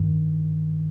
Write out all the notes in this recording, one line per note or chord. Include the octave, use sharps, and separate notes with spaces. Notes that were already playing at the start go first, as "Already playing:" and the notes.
Already playing: G2 D#3